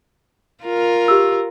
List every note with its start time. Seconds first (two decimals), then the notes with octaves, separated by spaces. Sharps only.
0.64 F4 A#4
1.08 G4 E6